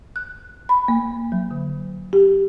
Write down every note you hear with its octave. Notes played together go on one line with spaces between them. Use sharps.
F#6
B5
A#3
F#3
D3
G4